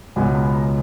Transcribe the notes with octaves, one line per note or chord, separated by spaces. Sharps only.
C#2 B2 G#3 B3 G#5
B5
A#5